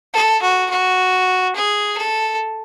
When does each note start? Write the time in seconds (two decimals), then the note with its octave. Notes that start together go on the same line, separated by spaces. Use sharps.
0.14 A4
0.42 F#4
0.70 F#4
1.56 G#4
1.98 A4